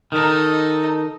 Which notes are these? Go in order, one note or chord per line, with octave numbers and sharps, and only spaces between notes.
D#3 D#4 A4